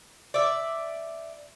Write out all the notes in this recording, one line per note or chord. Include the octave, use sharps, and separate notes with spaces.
D5 E5